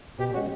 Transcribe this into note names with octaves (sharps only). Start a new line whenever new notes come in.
B2 G4
G#3 C#4 F#4